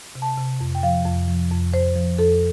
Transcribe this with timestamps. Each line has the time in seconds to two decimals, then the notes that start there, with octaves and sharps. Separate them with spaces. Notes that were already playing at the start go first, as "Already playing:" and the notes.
0.15 C3
0.22 A5
0.38 C3
0.60 F2
0.75 G5
0.83 F3 F5
1.05 F2
1.28 F3
1.51 F2
1.73 F2 C5
1.96 F3
2.18 F2 A4